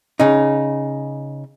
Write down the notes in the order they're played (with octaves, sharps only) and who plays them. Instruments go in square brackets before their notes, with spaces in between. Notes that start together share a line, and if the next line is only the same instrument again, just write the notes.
[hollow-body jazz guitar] C#3 D#4